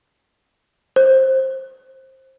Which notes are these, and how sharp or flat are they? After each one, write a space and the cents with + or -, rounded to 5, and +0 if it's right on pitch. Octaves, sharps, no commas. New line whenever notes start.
C5 +20